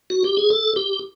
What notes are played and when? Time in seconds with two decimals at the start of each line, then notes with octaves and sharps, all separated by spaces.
0.10 F#4
0.24 G4
0.37 G#4
0.50 A4
0.76 G4